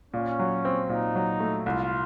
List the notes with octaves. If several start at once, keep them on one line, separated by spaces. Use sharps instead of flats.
A#2 C#4
F#3
C4
A#2 D#4
F#3
A3
C2 F4